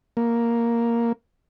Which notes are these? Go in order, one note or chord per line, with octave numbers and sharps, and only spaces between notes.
A#3